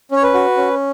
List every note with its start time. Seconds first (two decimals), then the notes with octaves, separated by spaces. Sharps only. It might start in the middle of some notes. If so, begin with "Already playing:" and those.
0.11 C#4 C#5
0.23 B4
0.34 F#4
0.57 C#4